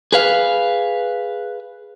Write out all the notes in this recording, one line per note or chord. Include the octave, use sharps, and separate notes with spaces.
G#4 B4 F5